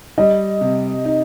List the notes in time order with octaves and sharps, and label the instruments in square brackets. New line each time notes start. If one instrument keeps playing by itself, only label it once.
[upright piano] G3 [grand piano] D#5
[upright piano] C3
D#4